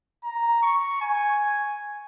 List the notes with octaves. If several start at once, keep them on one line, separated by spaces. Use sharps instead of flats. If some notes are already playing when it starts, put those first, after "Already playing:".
A#5
C#6
G#5